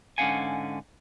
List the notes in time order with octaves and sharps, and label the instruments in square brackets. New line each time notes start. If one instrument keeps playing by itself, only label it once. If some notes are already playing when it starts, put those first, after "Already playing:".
[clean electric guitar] G#2 D3 C#4 F5 F#5 G#5